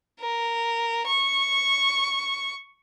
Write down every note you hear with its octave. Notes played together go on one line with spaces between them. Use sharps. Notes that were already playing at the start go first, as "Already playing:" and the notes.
A#4
C#6